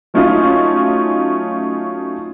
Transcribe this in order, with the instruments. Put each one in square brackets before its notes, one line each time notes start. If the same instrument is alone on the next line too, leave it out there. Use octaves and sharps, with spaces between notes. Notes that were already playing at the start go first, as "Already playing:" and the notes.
[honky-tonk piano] F#3 A3 C#4 D#4 F4